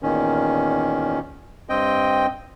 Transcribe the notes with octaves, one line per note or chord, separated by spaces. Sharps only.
E2 A#2 D#3 C#4
G2 C4 D#5 G5